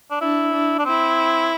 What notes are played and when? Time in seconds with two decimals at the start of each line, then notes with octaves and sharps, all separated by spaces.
0.11 D4
0.22 D4 E4
0.53 D4
0.79 D4
0.86 C4 E4